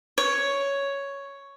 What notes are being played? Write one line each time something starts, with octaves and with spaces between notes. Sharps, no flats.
C#5